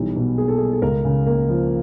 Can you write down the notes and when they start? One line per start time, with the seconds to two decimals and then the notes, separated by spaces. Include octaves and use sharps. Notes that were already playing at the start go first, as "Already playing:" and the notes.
Already playing: B1 E3 G3
0.16 B2
0.38 A#3 G#4
0.48 A4
0.58 G#4
0.60 G3
0.72 A4
0.82 C#2 A#4
1.05 C#3
1.26 A#3
1.49 F3